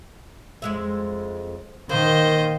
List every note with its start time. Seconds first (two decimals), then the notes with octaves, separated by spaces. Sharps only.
0.62 F2 G#3 E5
1.89 D#3 A#3 C5 D#5